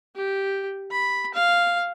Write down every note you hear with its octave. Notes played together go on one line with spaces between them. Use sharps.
G4
B5
F5